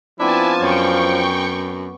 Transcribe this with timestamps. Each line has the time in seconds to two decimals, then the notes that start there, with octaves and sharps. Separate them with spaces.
0.20 F3 B3 C4 D4 E4 G#5 A5
0.62 F#2 C#5 G5 G#5 B5 C#6